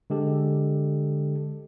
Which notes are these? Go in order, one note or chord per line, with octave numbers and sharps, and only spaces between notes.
D3 G#3 G4 A4